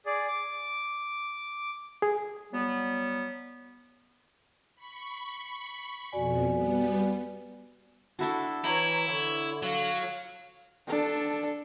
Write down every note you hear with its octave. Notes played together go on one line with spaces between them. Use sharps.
G#4 D5
D6
G#4
F#3 G3 B3
B5 C#6
F2 B2 F#4 D5 G#5
G3 B3
D4 E4 F#4 A4
E3 E4 C#5 D#5 A#5
D3 C#5
F#3 F5
D4 A4